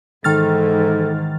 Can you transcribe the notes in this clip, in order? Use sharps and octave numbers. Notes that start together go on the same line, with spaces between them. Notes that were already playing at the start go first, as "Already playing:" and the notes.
G#2 D#3 E3 A4 F6 A6